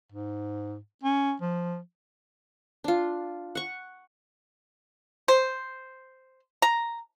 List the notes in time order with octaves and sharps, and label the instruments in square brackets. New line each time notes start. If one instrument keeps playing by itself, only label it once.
[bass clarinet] G#2
C#4
F3
[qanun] D4 F4
F#5 C#6
[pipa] C5
A#5